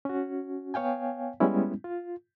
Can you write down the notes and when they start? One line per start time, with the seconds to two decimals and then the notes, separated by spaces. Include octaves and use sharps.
0.05 C#4 F#4
0.74 B3 C#5 F5 G5 G#5
1.40 G3 G#3 B3 C#4 E4
1.84 F4